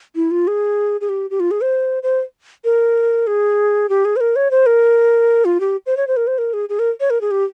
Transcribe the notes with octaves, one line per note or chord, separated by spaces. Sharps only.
E4
F4
G#4
G#4
G4
G4
F4
G#4
C5
C5
A#4
G#4
G4
G#4
C5
A#4
C#5
C5
A#4
F4
G4
C5
C#5
C5
A#4
C5
A#4
G#4
G#4
A#4
C#5
A#4
G#4
G4